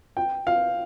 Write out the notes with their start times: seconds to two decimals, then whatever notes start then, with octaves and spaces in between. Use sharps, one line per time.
0.17 G5
0.47 F5